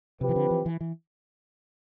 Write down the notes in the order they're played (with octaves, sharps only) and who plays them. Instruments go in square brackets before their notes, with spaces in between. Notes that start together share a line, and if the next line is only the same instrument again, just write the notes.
[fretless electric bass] C3 [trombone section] F3 C4 G4 B4
[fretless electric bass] E3
D3
E3
E3
E3